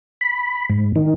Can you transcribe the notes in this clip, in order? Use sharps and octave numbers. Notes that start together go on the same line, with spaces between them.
B5
G#2
D#3